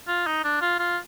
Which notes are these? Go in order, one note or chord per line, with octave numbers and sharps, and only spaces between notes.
F4
D#4
D4
F4
F4